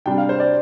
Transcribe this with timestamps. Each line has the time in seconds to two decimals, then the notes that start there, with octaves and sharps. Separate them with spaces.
0.06 C3 G3 D4 G5
0.18 F5
0.29 C5
0.40 D5